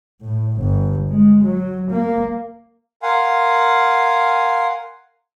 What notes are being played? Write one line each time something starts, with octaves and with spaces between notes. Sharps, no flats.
A2
G1
G#3
F#3
A#3
A#4 F5 F#5 G#5 C6